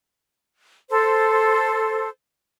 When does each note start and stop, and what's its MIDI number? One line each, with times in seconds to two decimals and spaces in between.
0.90 2.08 69
0.90 2.08 72